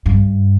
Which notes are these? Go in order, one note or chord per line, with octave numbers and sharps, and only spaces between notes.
G2